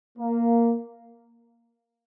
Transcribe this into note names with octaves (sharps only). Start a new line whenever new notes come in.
A#3